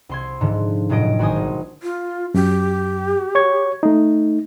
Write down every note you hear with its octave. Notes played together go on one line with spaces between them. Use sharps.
C2 C6 G#6
G#2 D3 F3
F1 A2 F#3 D#5 D7
G#1 F#4 C5 G#5 D#6
A#1
F4
F#2 G4
C#5 C#6 G#6
A3 D#4